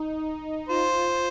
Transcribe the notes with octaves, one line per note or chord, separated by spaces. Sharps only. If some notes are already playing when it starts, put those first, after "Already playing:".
Already playing: D#4
F4 C5